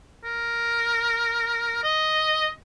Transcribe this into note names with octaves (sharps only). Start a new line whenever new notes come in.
A#4
D#5